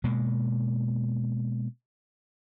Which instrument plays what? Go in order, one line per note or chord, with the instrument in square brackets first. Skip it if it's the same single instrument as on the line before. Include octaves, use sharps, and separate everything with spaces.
[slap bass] B2 G#3 A#3